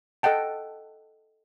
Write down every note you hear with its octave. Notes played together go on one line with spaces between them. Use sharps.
A4 D#5 F#5 G5 A5